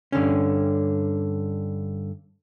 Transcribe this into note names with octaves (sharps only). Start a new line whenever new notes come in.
G2 D3 C#4